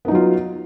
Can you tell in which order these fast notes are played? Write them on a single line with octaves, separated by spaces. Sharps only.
B3 D#4 F#3 F4